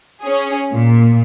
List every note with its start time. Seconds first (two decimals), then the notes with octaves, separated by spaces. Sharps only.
0.23 C#4 G#4
0.73 A#2